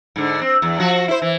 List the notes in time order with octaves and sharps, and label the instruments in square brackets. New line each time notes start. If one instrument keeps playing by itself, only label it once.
[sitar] G#2 D3
C4
E2
F3 F#4
E4 C5
E3